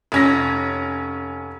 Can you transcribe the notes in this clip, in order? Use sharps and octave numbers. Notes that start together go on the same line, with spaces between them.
F1 C#4 A#6